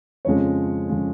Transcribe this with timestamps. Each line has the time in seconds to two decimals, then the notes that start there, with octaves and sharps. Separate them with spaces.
0.25 F2 C#3 F3 G#3 C#5
0.89 C#3 F3 G#3